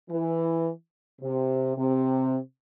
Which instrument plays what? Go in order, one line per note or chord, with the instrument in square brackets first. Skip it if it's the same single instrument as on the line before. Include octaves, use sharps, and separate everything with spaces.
[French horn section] E3
C3
C3